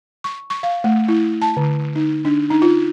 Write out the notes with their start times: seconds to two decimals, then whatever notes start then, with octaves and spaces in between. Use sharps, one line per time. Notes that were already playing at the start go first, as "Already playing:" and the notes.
0.24 C#6
0.50 C#6
0.63 F5
0.84 A3
1.08 E4
1.42 A5
1.57 D3
1.95 D#4
2.25 D4
2.50 D#4
2.62 F4